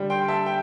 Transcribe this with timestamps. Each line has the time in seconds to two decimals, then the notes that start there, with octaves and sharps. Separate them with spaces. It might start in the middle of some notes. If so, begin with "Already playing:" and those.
Already playing: D3 G3
0.10 G5 C6
0.28 E5 A5
0.46 G5